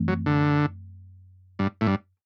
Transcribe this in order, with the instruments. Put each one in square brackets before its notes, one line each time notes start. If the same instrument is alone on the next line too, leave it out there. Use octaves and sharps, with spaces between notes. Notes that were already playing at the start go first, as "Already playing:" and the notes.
Already playing: [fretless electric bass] F#2 E3 A3 C4
[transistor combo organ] F#3
D3
G2
A2
G2